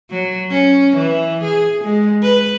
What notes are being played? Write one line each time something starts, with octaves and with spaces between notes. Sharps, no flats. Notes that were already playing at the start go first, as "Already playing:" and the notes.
F#3
C#4
E3
G#4
G#3
B4